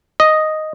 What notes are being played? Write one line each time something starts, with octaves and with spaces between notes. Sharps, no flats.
D#5